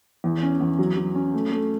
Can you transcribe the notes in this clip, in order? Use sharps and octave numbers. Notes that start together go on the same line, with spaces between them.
E2
C#4
E2
F#3
F#3
C#4
A3
A3